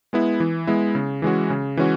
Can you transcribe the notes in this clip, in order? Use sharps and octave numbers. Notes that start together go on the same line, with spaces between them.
G#3 B3 E4
E3
G#3 B3 E4
C#3
E3 G#3 C#4 F#4
C#3
E3 G#3 C#4 F#4